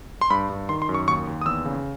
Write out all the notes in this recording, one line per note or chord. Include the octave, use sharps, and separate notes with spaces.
C6
G2 B5
G2
D#3 C6
C6
F#2
C#6
D#2 C#6
D#2
D#6
E2 E6
C#3